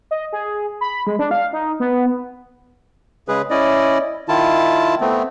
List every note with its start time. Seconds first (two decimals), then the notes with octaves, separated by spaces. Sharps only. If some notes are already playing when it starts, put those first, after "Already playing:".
0.11 D#5
0.33 G#4
0.81 B5
1.07 G#3
1.19 D4
1.31 F5
1.53 D#4
1.80 B3
3.28 C#3 G#3 G#4 B4
3.50 C#4 E4 D5 D#5
4.29 D#3 E4 F4 A5
5.01 A3 B3 C4